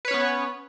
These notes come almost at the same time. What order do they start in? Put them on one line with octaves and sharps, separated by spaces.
B4 C#5 C#4 B3